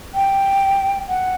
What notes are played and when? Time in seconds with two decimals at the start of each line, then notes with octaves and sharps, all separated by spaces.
0.14 G5
1.08 F#5